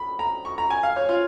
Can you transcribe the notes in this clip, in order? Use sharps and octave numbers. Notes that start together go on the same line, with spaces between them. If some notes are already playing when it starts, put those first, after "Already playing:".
Already playing: B5
A#5
C#6
A#5
G#5
F5
C#5
F4